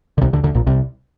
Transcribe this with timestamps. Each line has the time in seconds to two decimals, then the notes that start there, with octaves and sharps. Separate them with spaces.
0.18 D3
0.22 C2 C3
0.33 D2 D3
0.44 D2 D3
0.55 A#1 A#2
0.67 C2 C3